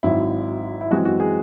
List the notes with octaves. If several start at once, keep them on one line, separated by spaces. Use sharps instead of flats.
G#1 G#2 F#3 C4 E4
E4
F#2 E3 G#3 C4 F#4
F#4
G#4